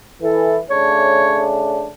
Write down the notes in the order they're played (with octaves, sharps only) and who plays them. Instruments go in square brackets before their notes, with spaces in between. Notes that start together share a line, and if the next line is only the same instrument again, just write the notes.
[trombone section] E3 [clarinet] A4
[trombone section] C#3 A3 D4 [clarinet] C#5